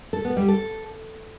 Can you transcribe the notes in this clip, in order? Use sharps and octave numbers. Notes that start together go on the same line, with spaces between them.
A4
B3
G3
A4